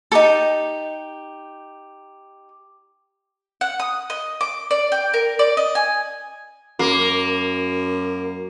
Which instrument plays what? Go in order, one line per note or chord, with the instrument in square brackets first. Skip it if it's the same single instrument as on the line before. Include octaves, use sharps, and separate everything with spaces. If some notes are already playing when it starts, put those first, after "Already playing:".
[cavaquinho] D#4 G4 A4
[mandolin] F#5
D#6
D#5
D6
D5
G5
A#4
D5
D#5
G#5
[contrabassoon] F#2 [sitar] A#3